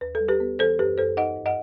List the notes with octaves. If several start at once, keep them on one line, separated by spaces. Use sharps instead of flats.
D#2 B4
A4
G3
G4 B4
B3
E3 A4 C5
F#2 G4 B4
F#2 A4 C5
D#4 D#5 F#5
G2
D#5 F#5